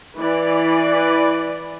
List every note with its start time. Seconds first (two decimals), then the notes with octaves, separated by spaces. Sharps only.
0.18 E3 B4 D5